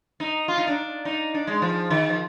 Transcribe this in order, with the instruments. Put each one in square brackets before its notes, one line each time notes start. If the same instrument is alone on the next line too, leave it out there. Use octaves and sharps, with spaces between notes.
[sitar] D#4
F4
D#4
D4
D#4
D4
G#3
F3
D#3
F3